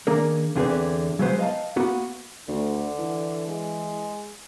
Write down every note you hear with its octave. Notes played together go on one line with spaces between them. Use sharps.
D#3 A#3 D4 G#4 A#4
E2 D3 C4 G#4 A#4 B4
F#3 G#3 B3 B4 C5
D#5 F5 G#5 A5
A#3 B3 F#4
D2 D3
E3
G#3